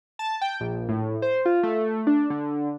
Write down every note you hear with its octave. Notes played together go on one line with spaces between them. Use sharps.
A5
G5
A#1
A2
C5
F4
A3
D4
D3